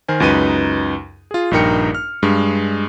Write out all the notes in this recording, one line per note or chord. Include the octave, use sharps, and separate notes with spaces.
D#3 A#4 C5 G#5
C#2 F#2 D#4 B4 D#7
F4 G#4
A#1 G2 D#4 A#4 G5 C#7
F6
G2 G#3